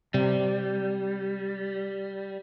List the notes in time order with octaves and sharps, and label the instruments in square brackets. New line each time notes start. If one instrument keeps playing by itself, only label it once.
[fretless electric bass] C3 [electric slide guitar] G3